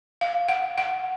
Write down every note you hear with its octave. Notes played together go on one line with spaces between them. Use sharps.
F5
F#5
F#5